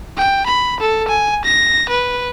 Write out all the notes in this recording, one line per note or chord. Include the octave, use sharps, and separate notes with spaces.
G5
B5
A4
G#5
A#6
B4